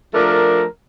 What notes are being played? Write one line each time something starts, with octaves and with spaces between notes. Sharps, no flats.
F3 A3 D4 A#4